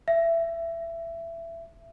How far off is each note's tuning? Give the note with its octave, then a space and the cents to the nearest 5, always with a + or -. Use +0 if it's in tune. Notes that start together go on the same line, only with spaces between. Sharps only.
E5 +20